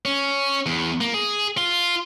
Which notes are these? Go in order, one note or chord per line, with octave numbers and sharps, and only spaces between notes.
C#4
E2
A#3
G#4
F4